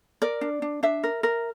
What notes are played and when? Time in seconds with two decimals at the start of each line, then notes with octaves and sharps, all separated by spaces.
0.22 A#4 D5
0.41 D4
0.62 D4
0.83 D4 E5
1.04 A#4
1.23 A#4